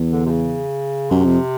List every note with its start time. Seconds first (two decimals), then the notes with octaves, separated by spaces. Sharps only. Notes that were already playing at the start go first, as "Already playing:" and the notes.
Already playing: E2
0.11 D3
0.26 C3
0.30 C#3
1.10 F#2 C3
1.25 F2